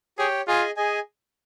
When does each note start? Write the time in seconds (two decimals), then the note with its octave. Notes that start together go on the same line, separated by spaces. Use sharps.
0.18 G4 G#4 C#5 G5
0.48 F4 G#4 D#5 G#5
0.77 G#4 D#5 G#5